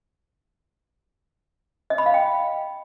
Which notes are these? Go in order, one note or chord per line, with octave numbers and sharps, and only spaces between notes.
D#5
B5
F5
G5